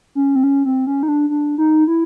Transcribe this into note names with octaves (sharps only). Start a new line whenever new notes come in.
C#4
C4
C#4
C4
C#4
D#4
D4
D4
D#4
E4